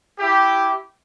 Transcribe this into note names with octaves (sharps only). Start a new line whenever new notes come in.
E4 G4